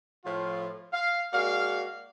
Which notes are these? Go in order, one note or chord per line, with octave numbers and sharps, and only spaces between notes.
A2 F3 F4
F5
G#3 A#3 F#4 D5 F5